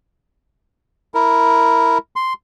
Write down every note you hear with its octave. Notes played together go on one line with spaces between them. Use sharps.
E4 A#4
C6